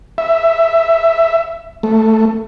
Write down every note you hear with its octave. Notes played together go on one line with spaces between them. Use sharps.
E5
A3